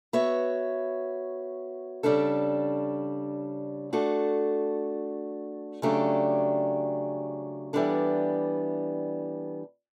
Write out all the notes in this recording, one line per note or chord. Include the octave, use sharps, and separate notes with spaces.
B3 F#4 C#5 E5
C#3 G3 D4 A4
A3 D4 F#4 A4
C#3 F#3 A3 D4 G4
E3 G3 B3 D4 A4